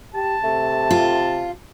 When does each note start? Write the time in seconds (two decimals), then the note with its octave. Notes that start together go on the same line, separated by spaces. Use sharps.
0.14 G4 A5
0.44 C3 A3
0.91 F4